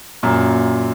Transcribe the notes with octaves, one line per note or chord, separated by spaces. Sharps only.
F#2 A#2